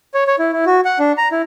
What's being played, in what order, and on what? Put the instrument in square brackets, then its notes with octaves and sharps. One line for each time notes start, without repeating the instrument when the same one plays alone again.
[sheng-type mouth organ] C#5
C#5
E4
E4
F#4
F#5
D4
A#5
E4